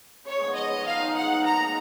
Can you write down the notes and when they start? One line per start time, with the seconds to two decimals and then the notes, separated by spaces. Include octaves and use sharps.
0.25 C#3 C#5
0.39 F3 G#3 B3
0.54 C#3 D#5
0.69 F3 G#3 B3
0.84 D#3 F5
0.99 G#3 D#4
1.14 D#3 F#5
1.30 G#3 D#4
1.44 F3 A#5
1.59 A#3 D#4 F#4